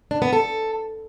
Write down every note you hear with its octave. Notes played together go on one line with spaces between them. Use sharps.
D4
B3
A4